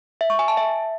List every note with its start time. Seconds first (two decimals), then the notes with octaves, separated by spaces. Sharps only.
0.21 E5
0.30 C#6
0.39 G#5
0.48 A5
0.57 E5